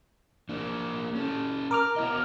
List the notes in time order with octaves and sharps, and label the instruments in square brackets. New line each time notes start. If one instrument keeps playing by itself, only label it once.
[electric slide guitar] A#3 D4
C#4 A4
[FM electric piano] A#4 D6 F6
[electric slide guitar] B3 E4 D#5